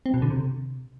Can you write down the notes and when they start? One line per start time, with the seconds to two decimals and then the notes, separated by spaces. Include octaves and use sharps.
0.06 C4
0.14 B2
0.22 D3
0.30 C3